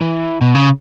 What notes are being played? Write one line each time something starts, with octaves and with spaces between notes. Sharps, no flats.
E3
B2
C#3